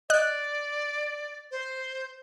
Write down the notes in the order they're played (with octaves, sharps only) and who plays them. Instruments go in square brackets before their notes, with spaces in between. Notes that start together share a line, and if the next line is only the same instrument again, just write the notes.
[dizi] D5 [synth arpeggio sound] D#5 F#6
[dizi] C5